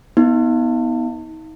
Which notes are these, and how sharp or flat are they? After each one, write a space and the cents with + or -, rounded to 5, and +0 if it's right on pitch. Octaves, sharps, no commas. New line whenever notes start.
B3 -5 D#4 +35